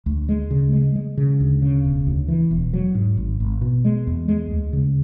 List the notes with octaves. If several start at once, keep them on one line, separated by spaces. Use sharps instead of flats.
D2
G#3
C#3
G#3
G#3
C#3
D2
C#3
E1
D2
E3
E1
F#3
G#2
G#1
G#1
B2
G#3
E2
G#3
D2
C#3